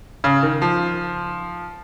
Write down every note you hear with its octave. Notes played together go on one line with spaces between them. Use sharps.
C#3
D#3
F3